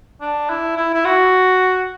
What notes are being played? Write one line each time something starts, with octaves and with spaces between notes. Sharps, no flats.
D4
E4
E4
E4
F#4